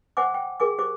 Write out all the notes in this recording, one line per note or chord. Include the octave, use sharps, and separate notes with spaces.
C5 F#5 G#5 D6
G5
G#4 A#4 G#5 D6
G4 C5 D6